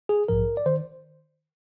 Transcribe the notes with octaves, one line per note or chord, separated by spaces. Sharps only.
G#4
A#1 G#2 F3 A#4
D5
D#3 C5